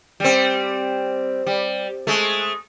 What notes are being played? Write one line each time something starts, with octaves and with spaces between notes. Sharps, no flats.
G3 C4
G3
G#3 A3